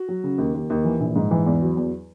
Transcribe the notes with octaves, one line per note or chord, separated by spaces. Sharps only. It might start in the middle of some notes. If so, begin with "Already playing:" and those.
Already playing: F#4
F#3
C#3
D#2
D#2
D#2
E3
A#1
G#2
E3
E2
F#3
E2